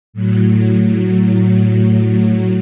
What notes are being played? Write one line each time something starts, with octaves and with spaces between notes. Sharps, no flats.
A2 F#3